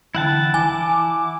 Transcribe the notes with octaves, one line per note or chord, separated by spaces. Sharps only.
D3 E3 E4 F#5 G5 A5
E3 G#5 D6